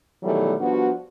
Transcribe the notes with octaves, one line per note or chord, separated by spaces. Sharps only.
B2 D#3 E3 F#3 G3 A3
F3 G3 B3 D4 F#4